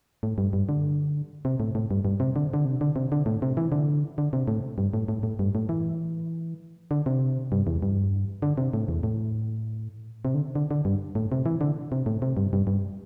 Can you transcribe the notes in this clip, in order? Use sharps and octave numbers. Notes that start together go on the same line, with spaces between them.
A2
G2
G2
D3
C3
A2
A2
G2
G2
C3
D3
D3
C3
D3
C3
D3
A2
C3
E3
D3
D3
C3
A2
G2
A2
A2
A2
G2
A2
E3
D3
C3
G2
E2
G2
D3
C3
A2
E2
A2
C3
D3
D3
D3
G2
A2
C3
E3
D3
C3
A2
C3
G2
G2
G2